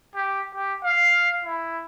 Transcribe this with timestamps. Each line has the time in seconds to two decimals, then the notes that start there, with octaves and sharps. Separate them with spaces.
0.15 G4
0.55 G4
0.83 F5
1.45 E4